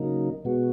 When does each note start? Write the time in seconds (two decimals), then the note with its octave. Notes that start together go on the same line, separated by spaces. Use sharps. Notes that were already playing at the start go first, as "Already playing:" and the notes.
Already playing: C#3 F#3 A#3 D#4
0.45 B2 G#3 B3 F#4